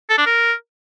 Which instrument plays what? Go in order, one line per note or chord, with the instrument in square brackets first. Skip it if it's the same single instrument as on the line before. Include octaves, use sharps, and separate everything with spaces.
[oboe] A4
D4
A#4